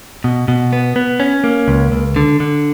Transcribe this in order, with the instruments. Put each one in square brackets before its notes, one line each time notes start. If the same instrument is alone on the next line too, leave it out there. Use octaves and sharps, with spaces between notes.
[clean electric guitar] B2
B2
B3
B3
C#4
A#3
C#2
C#2
D3
D3